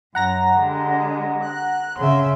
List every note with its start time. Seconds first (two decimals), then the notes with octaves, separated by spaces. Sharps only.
0.15 F#2 F#5 A#5 A#6
0.58 D3 G3 G#3
1.43 F#6
1.98 C#3 E5 C6